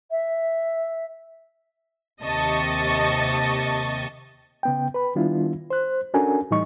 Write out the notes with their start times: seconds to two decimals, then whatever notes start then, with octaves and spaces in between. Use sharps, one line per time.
0.11 E5
2.21 D#2 C3 D#5 A5 C#6 A6
4.63 C#3 B3 G5
4.94 B4 B5
5.15 D#3 G3 B3 D4 E4 F4
5.70 C5 F#6
6.14 C#4 D4 F#4 A4 A#4 G#5
6.51 A2 E3 G3 D#4 D#5 C#6